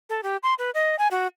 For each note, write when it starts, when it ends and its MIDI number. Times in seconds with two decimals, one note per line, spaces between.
0.09 0.21 69
0.23 0.37 67
0.43 0.54 84
0.58 0.70 71
0.74 0.96 75
0.99 1.08 80
1.11 1.27 66